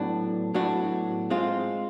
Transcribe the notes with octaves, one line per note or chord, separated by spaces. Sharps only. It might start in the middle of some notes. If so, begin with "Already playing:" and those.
Already playing: A2 F#3 B3 D4 F#4
A2 F#3 B3 D4 F#4
G#3 C4 F4